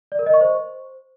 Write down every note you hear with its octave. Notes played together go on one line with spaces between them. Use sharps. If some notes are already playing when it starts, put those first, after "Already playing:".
D5
A#4
D#5
C#6
C5